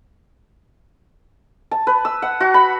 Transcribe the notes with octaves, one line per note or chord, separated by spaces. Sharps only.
A5
B4
E6
F#5
F#4
B5